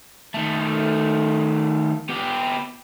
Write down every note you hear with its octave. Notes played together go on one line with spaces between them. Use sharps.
D#3 A3
B3 G4